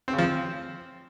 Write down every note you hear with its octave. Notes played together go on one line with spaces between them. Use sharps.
C4
C#3
F3
C4